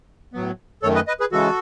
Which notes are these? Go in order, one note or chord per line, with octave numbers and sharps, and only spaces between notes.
A2 F#3 B3
F#2 D#3 A3 A4 C#5
B4 D#5
B4 D#5
G#4 B4
C#3 E3 G#3 F#4 A4